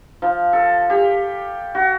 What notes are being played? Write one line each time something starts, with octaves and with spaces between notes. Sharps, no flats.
F3
A4
G4
F#4